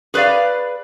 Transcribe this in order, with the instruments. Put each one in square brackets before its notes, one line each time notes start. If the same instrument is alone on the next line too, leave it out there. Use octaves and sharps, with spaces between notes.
[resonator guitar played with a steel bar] G#4 B4 C5 D5 F5